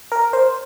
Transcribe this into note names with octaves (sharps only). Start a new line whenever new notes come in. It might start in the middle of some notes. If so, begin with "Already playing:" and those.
A#4
C5